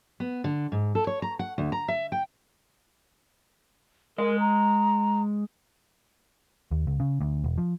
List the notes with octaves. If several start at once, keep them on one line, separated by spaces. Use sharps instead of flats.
B3
D3
G#2
A4
C#5
A#5
F#5
D2
A#5
E5
G5
G#3 A#4 D#5
A#5
D#2
C#2
C#3
D2
E1
F3